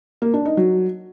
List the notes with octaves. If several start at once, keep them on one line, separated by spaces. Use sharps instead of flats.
A#3
D4
D#4
F#3